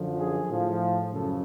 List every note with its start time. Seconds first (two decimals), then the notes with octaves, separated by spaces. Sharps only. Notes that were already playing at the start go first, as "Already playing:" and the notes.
Already playing: F#2 D3 F3
0.19 G#4
0.50 A2 F3
1.12 F#2 C#3 F3 A4